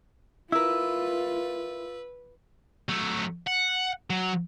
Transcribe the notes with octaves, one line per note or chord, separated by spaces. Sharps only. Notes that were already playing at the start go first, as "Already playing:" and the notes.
E4 F4 A#4 B4 E6
F#3 A3
F#5
F#3